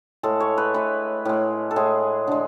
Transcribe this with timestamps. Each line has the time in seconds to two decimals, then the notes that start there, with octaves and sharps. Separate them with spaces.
0.23 A2 G#3 A4
0.40 C#5
0.58 B4
0.74 A2 G#3 B4
1.25 A2 G#3
1.71 A4
1.76 A2 G#3 G#4
2.27 D3 G#3